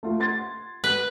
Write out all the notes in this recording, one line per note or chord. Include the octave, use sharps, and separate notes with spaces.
A3 F4
C6 G#6 A6
B4